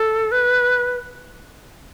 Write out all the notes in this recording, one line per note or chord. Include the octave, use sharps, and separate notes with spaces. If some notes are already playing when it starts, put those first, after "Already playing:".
Already playing: A4
B4